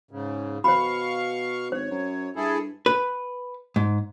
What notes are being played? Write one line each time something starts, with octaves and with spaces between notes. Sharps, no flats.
G#2 C#3
B2 C5 F5 B5 C#6
G#1 C5 C#5
F#2
G2 E4 G#4 A4
B4
G#2